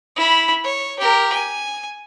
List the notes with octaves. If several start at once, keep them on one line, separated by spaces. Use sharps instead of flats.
E4 B5
C#5
G4 A#4
G#5